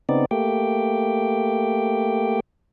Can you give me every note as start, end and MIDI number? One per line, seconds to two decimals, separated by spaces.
0.09 0.25 49
0.09 0.25 59
0.09 0.25 60
0.09 0.25 63
0.09 0.25 74
0.31 2.40 57
0.31 2.40 58
0.31 2.40 67
0.31 2.40 79